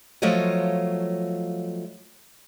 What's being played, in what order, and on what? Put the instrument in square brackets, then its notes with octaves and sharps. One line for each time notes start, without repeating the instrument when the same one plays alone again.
[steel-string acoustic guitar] F3 F#3 A3 F4 C#5 D#5